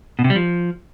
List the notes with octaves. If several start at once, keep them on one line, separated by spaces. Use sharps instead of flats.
B2
C3
G3
F3